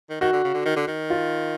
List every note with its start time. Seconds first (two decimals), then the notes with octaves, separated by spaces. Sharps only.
0.10 D#3
0.21 D#3 F#4
0.33 D3
0.44 C#3
0.54 D3
0.66 D#3
0.76 D3
0.87 D#3
1.10 F4